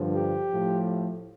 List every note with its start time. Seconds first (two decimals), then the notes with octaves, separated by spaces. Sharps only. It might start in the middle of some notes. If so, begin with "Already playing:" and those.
Already playing: G2 D3 F3
0.14 G4
0.50 A2 F3